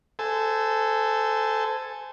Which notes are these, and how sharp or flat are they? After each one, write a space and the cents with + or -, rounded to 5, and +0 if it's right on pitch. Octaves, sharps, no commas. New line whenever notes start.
A4 +0 C5 -25 G#5 +0